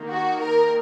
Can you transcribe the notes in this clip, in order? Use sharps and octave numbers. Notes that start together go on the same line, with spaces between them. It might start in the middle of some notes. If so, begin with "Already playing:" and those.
Already playing: D#3 A#3 D#4
F#4
A#4